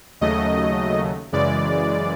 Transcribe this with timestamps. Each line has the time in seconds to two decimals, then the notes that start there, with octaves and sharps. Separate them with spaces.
0.21 D#2 C#3 F#3 A3 D#5
1.32 F#2 C#3 E3 G#3 D5